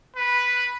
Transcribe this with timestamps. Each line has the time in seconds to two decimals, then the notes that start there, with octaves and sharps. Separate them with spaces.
0.16 B4